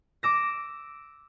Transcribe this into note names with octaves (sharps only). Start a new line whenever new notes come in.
D6 E6 A#6